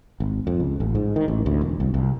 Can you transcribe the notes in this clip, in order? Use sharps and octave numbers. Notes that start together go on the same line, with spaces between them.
G#1
F2
C#2
A1
G#2
D#3
A1
D2
E1
C2
C2